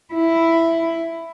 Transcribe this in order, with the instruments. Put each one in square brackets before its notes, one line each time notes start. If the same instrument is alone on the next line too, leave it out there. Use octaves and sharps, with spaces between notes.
[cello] E4